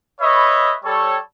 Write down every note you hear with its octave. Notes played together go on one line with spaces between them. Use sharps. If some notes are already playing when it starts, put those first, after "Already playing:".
B4 C#5 D#5 E5 B5 C#6
G3 A4 C#5